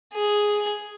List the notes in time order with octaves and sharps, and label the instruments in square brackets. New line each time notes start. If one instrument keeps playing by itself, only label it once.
[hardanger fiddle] G#4